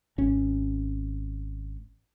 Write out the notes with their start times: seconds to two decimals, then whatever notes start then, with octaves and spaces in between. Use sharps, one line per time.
0.18 G#1 C#4